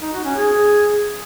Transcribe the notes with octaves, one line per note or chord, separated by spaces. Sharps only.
D#4
F#4
C#4
G#4